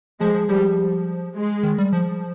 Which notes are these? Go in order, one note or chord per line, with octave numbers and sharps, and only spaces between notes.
F3 G#3
F3
F3 G3
G#3
D#3
G3
F3